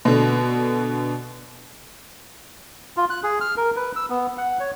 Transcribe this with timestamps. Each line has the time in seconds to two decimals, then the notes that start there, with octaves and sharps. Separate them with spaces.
0.05 B2 D3
2.97 F4
3.10 F#6
3.24 G#4
3.41 F6
3.57 A#4
3.76 B4
3.96 E6
4.10 B3
4.38 F#5
4.60 C#5